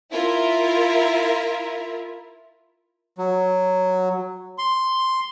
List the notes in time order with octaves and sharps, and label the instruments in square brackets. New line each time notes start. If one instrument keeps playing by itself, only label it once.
[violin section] E4 F4 A#4 E5
[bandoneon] F#3
C6